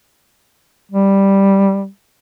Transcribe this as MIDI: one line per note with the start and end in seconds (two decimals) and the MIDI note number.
0.91 1.87 55